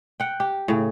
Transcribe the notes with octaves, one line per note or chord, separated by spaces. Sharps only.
F#5 G5
G4
A2 C#3